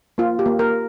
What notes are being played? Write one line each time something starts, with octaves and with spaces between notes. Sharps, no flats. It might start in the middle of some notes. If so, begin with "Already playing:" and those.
A#3 F4
G4
A#3
A#4
A#3